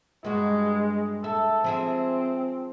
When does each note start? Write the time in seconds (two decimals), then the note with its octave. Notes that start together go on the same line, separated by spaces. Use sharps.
0.25 G2 G#3 F#4
1.24 A4 E5
1.64 F3 C4 G#4 E5